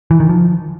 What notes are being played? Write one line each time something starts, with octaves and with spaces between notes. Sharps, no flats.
E3
D#3
F3